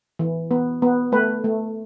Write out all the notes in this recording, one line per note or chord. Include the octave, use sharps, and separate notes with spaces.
E3
B3
B3
A3 B4
A3